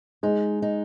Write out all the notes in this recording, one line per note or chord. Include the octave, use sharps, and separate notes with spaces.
G#3 D#4
D#4